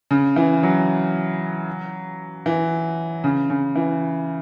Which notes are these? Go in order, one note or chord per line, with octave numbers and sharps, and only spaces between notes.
C#3
E3
F#3
E3
C#3
C#3
E3